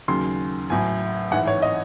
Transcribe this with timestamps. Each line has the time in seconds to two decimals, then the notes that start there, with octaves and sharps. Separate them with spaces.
0.08 D#2 C#3 F#3 C6
0.70 A1 A2 F#3 G#5
1.31 A1 G#2 E3 F#5
1.47 C#5
1.62 D#5